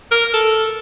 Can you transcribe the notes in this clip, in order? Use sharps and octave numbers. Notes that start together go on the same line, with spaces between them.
A#4
A4